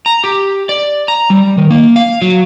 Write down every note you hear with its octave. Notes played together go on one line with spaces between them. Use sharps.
A#5
G4
D5
A#5
G3
D#3
A#3
F5
F#3